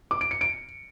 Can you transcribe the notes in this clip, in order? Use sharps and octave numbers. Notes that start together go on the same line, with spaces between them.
D6
D7
C#7
D7